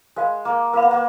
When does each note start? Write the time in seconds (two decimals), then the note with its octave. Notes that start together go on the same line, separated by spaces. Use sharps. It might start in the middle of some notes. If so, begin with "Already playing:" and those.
0.16 G#3 A#4 F5 B5
0.45 A#3
0.73 A#3 A#4 F5 B5
0.82 B3
0.91 A#3